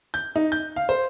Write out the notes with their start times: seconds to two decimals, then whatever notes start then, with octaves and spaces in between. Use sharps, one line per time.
0.14 G6
0.36 D#4
0.52 G6
0.76 F5
0.89 C5